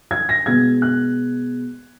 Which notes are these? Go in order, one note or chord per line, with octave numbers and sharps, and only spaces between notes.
G#6
A#6
B2 G#3 G#6
F#6